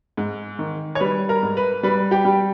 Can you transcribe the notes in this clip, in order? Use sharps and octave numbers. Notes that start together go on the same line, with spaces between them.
G#2
D#3
C#5
G3 B4
A#4
G#2
B4
G3 B4
G4 G5
G3